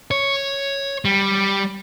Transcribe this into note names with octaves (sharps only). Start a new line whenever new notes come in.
C#5
G3